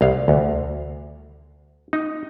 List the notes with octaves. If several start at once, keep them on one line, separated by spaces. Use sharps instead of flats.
C2 F5
D2
D#4